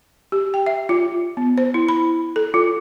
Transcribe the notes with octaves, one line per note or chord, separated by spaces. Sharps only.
G4
G5
E5
F4
B3
C5
E4
B5
A4
F4